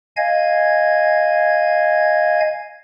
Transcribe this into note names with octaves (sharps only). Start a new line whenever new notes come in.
D#5 F5 G#5 G#6